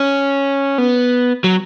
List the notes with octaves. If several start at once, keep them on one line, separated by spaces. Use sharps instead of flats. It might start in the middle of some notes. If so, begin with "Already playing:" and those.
Already playing: C#4
B3
F#3